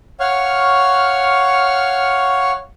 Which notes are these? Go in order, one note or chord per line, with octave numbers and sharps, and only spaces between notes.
C#5 F5 F#5 C#6 F6